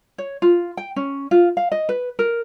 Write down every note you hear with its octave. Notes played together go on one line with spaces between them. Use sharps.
C#5
F4
G5
C#4
F4
F5
D#5
B4
A#4